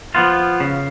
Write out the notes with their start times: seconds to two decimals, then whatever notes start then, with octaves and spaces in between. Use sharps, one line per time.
0.15 F3 B3 F4
0.60 C#3